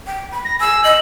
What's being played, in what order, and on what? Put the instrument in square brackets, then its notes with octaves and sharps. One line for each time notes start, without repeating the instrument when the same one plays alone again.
[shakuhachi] G5
B5
[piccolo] A#6
[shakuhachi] G#5 [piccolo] E6
[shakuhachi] D#5 [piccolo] F#7